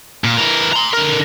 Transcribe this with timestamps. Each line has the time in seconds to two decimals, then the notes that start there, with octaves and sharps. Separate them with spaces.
0.24 A#2
0.38 E3 A#4
0.73 A#5 C6
0.93 D3 A#4